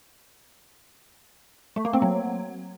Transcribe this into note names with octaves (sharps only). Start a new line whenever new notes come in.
A3
A#3
C4
F#3